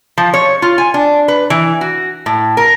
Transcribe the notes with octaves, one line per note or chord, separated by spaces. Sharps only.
F3
C#5
F4
G#5
D4
B4
E3
F#4
A2
A#4